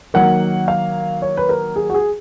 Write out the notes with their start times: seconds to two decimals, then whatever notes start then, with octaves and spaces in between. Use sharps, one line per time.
0.14 D#3 F#3 A#3 F#5
0.68 F5
1.22 C#5
1.37 B4
1.49 A#4
1.76 G#4
1.90 F#4
1.94 G#4